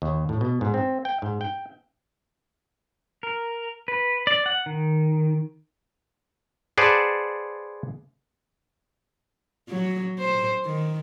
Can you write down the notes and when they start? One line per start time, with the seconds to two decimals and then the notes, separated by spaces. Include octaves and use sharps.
0.02 D#2
0.29 A2
0.41 B2
0.61 G#2
0.74 C4
1.05 G5
1.22 G#2
1.41 G5
3.23 A#4
3.88 B4
4.27 D5
4.46 F#5
4.66 D#3
6.78 G#4 B4 C5 D5 F#5 A5
9.69 F#3
10.19 C5
10.65 D#3